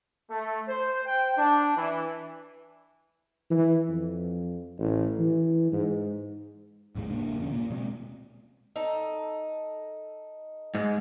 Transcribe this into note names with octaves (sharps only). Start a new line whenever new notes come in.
A3
C5
G5
D4
E3
E3
F2
A1
E3
G#2
A1 D#2 G#2 G#3
G1 C3 A#3 D4
F2 D3 C#4
A#2 A#3
B2 G3 G#3 C4
D#4 A4
G#2 G#3